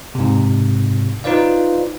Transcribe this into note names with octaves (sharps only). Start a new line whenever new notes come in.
G#2 C3
D#4 F4 B4 C5 D5 F5